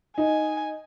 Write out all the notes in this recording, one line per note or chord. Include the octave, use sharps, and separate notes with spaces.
D#4 G#5